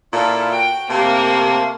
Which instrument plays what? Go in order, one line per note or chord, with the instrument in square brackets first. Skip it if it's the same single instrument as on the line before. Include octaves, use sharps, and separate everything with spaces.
[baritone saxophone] A#2 [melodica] E4 F4 [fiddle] A4
[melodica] F#4 [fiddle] G5
[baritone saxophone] C3 [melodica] A3 F5 C6 [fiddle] A#3